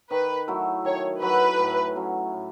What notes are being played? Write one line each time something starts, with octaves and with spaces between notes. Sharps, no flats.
D#3 B4
F#3 A3 E4
D#3 C#5
F#3 A3 E4 B4
A2
F#3 C#4
A2